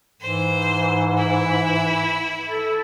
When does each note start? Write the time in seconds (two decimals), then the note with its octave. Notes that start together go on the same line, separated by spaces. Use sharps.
0.21 G#2 E3 C5
1.18 E4
2.49 A4